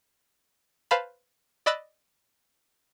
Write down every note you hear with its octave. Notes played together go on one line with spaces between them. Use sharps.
B4 C5 F5 A5 B5
D5 D#5 B5 E6 F#6 A6